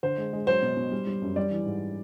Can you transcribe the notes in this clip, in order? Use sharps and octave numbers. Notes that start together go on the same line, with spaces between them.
D3 C5
G#3
G#3
F#3 C5
B2
B2
G3
G3
F#2
G3 D5
E3
G#2